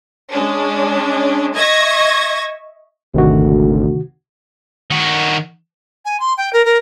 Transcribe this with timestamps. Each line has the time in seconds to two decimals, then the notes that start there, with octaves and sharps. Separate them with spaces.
0.31 G#3 C#4 D4
1.56 D#5 E5 C#6 G#6 A#6
3.14 G#1 D2 C3 D#3 F#4
4.91 D#3 F#4
6.05 G#5
6.20 C6
6.38 G5
6.53 A#4
6.65 A#4